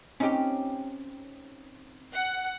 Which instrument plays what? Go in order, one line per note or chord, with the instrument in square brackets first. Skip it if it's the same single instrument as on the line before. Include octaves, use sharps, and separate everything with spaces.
[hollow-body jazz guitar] C4 D#4 D#5 [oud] C#4 G4
[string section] F#5